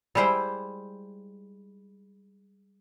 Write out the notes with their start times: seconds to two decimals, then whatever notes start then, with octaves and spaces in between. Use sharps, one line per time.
0.15 G3 G#3 E4 C5 G5